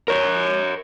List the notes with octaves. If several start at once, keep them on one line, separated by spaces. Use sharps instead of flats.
A#4 C#5